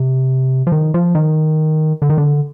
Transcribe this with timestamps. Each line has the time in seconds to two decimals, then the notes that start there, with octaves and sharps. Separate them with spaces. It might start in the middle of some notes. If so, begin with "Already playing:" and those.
Already playing: C3
0.67 F3
0.72 D#3
0.94 F3
1.15 D#3
2.02 D3
2.10 D#3
2.18 D3